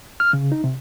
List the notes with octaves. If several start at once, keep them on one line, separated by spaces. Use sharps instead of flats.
F6
C#3
D#4
C3